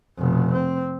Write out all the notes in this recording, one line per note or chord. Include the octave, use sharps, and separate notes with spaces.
F1 B2
C4